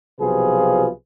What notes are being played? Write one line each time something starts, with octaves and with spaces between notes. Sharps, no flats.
B1 C3 F3 F4 G#4 B4